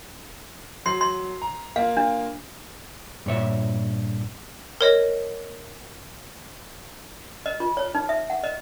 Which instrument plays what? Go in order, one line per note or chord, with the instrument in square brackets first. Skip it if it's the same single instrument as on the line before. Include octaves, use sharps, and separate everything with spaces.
[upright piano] F#3 C7 [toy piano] C6
[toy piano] C6
[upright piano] A#5
[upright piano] A#3 F4 [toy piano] F5
[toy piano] D4
[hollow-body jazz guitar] G2 A#2 C#5 E5
[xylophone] A#4 C#5 D#5
[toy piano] D#5
F4
C#5
D#4
E5
F#5
D#5